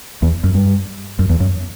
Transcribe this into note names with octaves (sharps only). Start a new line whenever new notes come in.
E2
F#2
G2
F#2
E2
F#2